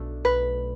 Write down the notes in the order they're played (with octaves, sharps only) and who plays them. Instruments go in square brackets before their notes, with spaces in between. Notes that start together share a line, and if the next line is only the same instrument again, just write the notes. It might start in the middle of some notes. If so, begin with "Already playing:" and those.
Already playing: [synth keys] B1 B2 A3 D4
[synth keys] B1 [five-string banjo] B4